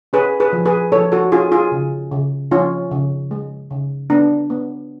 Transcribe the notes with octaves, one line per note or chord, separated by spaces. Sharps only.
C#4 G#4 B4
G#4 B4
F3
G#4 B4
F3 A4 C#5
F#4 A4
C#4 F4 G#4
F4 G#4
C#3
C#3
F3 C#4 F4
C#3
G#3
C#3
B3 D4
B3